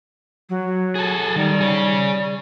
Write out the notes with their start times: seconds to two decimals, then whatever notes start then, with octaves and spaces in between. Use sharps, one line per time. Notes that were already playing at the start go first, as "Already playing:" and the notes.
0.50 F#3
0.95 G#4 A4
1.36 D#3 G3
1.61 G#4 C#5